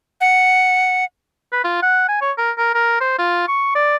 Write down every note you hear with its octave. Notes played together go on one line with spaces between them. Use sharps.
F#5
B4
F4
F#5
G#5
C#5
A#4
A#4
A#4
C5
F4
C#6
D5